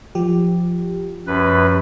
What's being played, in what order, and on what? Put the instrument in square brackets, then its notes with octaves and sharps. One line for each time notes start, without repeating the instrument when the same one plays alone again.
[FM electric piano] F3 G4
[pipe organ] F#2 B4